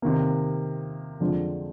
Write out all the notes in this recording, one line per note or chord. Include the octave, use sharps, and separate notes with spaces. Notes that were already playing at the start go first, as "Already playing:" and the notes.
C3 D#3 A#3
F2 D3 G#3 D4 F4